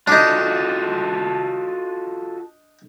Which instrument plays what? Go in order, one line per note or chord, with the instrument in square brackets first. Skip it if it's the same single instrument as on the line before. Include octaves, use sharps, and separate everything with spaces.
[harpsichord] D4 D#4 [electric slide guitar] F4 F#4 A4